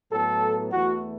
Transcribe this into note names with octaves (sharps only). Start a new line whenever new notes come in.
A2 F#3 B3 A4
E2 E3 A3 F#4